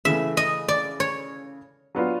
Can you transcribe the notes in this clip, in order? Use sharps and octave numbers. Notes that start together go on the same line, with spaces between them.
C#3 E3 A3 E5
D#5
D5
C#5
F#3 B3 D4 F4